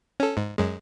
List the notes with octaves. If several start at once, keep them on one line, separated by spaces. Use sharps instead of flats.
C#4 A4
G#2
F#2 G#3